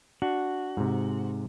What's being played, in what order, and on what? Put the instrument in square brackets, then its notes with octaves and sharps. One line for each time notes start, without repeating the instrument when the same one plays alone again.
[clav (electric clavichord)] D4 [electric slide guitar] F#4
[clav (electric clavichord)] G#2 C3